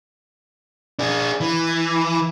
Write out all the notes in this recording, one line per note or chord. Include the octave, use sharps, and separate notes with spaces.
D4 G#4
E3